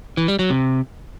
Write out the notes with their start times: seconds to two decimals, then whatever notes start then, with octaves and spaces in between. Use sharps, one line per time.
0.17 E3
0.28 G3
0.39 F#3
0.50 C3